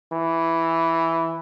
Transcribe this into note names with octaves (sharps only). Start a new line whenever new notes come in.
E3